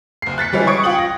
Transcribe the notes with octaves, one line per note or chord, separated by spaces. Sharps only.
F#1 C7
F#6 A6 B6 C#7
E3 G3 G#3 C#4 E4
C#6 D#6 G#6 C#7 D7
F4 G5 D#6 F#7
A#6